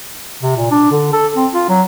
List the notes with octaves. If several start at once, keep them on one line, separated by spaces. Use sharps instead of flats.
C3
A#2
D4
D3
A4
C4
F4
F#3